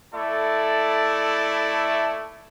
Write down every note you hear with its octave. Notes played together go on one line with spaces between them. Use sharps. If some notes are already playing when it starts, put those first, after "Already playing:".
A3 E4 A4 D5